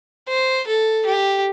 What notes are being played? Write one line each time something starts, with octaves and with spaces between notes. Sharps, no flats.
C5
A4
G4